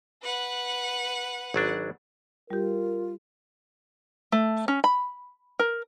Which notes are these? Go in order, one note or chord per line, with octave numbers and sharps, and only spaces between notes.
B4 F#5
G#1 F#3 D4
G3 F4 G4 A#4
A3
C#4
B5
A#4